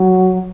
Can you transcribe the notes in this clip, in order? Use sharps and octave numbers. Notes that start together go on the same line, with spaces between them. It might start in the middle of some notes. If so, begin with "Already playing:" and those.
Already playing: F#3